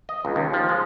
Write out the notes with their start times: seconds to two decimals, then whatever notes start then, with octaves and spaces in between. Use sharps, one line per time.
0.09 D#5
0.25 C#2
0.36 D#2
0.53 F3
0.69 G#3